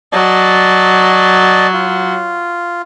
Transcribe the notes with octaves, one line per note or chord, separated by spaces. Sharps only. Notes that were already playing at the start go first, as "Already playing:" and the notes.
F#3 D5 D#5 A5
F4